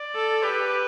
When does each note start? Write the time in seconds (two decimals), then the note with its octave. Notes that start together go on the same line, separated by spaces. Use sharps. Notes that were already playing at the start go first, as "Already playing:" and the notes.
Already playing: D5
0.15 A4
0.43 G4 B4